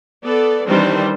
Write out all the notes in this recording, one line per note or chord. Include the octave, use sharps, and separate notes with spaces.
B3 A4 D5
D#3 E3 G3 C4 D4 C5